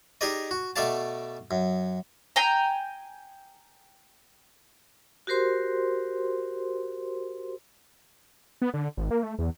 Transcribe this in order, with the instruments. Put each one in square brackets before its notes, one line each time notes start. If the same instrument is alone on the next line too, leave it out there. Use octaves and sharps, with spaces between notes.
[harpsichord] D#4 G4 G#4 A#4 D5 D#5
F#4
B2 A3 A4 D5 F5 A5
F#2
[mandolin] G5 G#5 A#5
[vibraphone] F#4 G4 A#4 C5 C6
[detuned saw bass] B3
D3
G#1
A#3
A3
E2